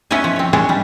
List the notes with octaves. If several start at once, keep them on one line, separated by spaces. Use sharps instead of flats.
B3 C#4 E4 B4 D#5 G#5
F3
C4 C#5
G#3 B3 C#4 D4 G#4
G3